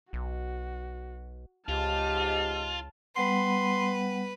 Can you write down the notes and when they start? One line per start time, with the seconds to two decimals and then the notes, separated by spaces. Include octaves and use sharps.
0.13 B1 F#4
1.68 C#2 G#2 F4 G4 D#5 A5 F6
3.16 G3 B3 B4 F#5 C6